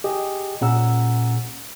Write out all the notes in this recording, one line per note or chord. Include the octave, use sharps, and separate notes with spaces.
G4 G#4 D#5
A#2 C#4 G#4 F#5 A#5 E6